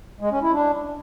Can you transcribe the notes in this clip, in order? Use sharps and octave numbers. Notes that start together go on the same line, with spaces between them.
G#3
C#4
E4
D4